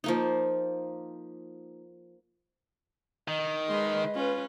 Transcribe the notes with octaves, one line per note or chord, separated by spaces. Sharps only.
F3 A#3 D#4
D#3 D#5
G#3 B4 C6
C#4 F4 B4